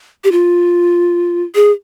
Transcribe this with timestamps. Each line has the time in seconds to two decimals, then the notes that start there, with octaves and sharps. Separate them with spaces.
0.24 G4
0.32 F4
1.55 G#4